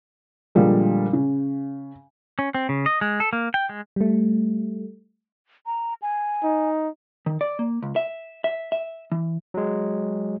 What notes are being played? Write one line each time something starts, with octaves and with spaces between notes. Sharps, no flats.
A#2 D3 F3 G3 G#3
C#3
C#4
C4
C#3
D#5
G#3
A4
A#3
G5
G#3
G3 A3
A#5
G#5
D#4
D#3
D5
A#3
C#2
E5
E5
E5
E3
F#3 G#3